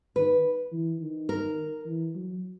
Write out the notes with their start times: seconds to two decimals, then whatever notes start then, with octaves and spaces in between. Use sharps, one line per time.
0.16 D#3 B4
0.72 E3
1.00 D#3
1.29 A#4
1.86 E3
2.15 F#3